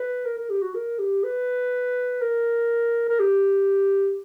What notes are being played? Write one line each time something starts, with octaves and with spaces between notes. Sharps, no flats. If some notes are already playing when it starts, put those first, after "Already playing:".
Already playing: B4
A#4
A#4
G4
F#4
A#4
G4
B4
A#4
A#4
G4